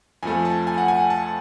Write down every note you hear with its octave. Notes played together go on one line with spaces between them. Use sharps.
F2 F3 A3 G#5
A5
G#5
F#5
G#5
A5